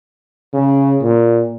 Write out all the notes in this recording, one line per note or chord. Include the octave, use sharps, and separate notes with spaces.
C#3
A#2